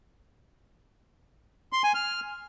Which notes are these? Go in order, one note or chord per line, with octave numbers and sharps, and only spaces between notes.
C6
G#5
F6